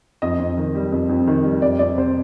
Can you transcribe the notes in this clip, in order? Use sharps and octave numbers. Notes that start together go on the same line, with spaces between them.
F2 D#5
F2
D#3
G3
F2
F2
D#3
G3
F2 D5
F2 D5
C3 C5